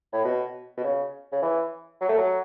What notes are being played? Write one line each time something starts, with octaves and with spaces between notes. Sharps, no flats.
A2
B2
B2
C#3
C#3
E3
F#3
A3
F#3